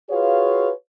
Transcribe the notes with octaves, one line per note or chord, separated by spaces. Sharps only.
F4 F#4 G#4 B4 C#5 F5